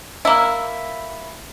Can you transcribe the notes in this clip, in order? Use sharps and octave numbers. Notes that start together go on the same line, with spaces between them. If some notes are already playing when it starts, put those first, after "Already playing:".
A#3 E4